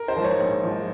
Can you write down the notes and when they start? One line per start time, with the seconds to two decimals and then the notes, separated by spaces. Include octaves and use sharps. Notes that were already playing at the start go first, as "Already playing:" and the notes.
Already playing: A#4
0.08 C5
0.16 G#2 F3
0.24 C#5
0.40 A#1
0.64 G#2 F3